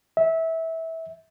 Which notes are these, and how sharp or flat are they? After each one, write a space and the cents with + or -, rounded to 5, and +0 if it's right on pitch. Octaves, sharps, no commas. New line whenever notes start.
E5 -20